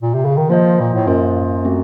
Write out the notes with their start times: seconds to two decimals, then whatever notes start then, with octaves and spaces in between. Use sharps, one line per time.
0.02 A#2
0.14 C3
0.25 C#3
0.37 D#3
0.49 F3 A#3 F4 C5 D#5
0.80 A#2
0.94 A2
1.07 F#2 A#3 F4 C5 D#5
1.65 A3 C4 F#4